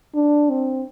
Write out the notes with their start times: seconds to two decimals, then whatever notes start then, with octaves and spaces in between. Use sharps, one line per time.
0.15 D4
0.50 C4